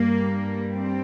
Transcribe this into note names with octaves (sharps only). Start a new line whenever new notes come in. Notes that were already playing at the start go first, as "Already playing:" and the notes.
Already playing: G2 G3 A#3
C4